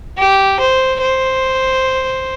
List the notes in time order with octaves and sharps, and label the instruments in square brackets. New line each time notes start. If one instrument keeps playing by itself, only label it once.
[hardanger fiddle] G4
C5
C5